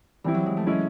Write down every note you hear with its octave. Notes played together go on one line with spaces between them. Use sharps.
E3 G3 C4 E4
F#3
G#3
A3
G#3 C#4 E4 G#4